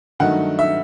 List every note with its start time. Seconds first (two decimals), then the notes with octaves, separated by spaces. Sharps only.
0.20 G2 D#3 F#3 A3 D#4 F#5
0.59 E5